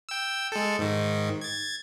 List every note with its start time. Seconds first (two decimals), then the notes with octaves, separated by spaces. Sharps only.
0.09 G5 E6
0.52 G#3 A4
0.79 G#2 D#3
1.41 G#6 A6